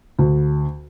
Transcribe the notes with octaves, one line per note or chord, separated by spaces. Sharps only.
D2